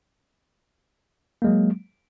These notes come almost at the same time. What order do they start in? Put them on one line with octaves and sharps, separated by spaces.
A#3 G#3 F#3